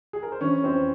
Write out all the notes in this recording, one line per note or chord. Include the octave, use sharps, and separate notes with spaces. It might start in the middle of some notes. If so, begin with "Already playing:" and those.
G#4
A#4
C5
E3 C#4 C#5
F2 C4 C5